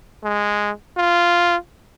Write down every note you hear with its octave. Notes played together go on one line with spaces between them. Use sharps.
G#3
F4